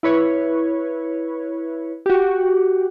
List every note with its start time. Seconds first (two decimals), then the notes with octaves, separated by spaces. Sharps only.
0.03 E4 B4 C#5
2.06 F#4 G4